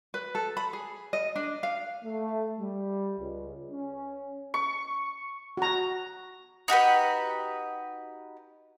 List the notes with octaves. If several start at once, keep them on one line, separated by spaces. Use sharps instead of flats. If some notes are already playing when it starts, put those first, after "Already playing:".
B4
A4
B5
G#4
D#5
D4
F5
A3
G3
C#2
C#4
C#6
F#4 A#5
D#4 F#4 G4 B4